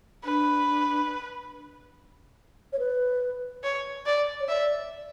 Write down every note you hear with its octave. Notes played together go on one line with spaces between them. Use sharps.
D4 B4
C#5
B4
C#5
D5
C#5
D5 E5